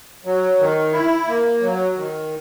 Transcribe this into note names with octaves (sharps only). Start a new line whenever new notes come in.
F#3
D#3
E4
A#3
F#3
D#3